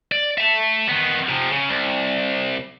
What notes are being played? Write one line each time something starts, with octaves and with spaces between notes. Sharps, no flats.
D5
E5 A5
D#3 B3
C3 F3
C#3
C2